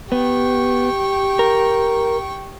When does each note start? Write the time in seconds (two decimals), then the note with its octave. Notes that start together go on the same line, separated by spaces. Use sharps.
0.12 B3 G4 G5 C#6
1.39 A#4